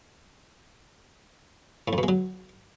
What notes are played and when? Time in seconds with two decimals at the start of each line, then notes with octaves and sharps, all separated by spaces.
1.88 A2
1.93 F2
1.98 B2
2.03 G#3
2.08 F#3